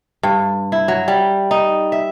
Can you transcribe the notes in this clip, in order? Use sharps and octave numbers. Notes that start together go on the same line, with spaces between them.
G2
E4
F#3
G3
D#4
E5